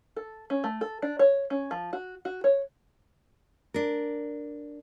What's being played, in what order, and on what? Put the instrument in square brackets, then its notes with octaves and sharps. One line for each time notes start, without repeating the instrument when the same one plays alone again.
[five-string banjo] A4
C#4
A3
A4
D4
C#5
C#4
F3
F#4
F#4
C#5
[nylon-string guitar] D4 A#4